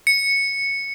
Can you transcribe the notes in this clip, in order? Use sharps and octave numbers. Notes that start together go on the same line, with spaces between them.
C#7